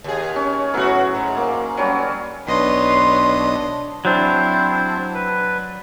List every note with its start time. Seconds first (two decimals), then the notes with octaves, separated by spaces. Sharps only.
0.04 D#2 G#4
0.36 C#4
0.74 A2 F#3 B3 F#4
1.15 G#2
1.37 A#3
1.77 F#3 G3 C#4
2.47 B1 D4 B4 C#5 D#5 C6 D#6
4.05 F#3 C4 D4 E4 C5
5.14 B4